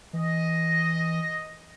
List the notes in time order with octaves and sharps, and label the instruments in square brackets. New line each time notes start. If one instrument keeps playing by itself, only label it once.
[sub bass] E3 [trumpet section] D#5